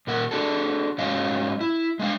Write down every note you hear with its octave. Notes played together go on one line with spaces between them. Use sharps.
A#2 A#4 F#5
D4 F#4 G#4 A4
G#2 F#3 C#4 D#5 F5
E4
G#3 D4 F5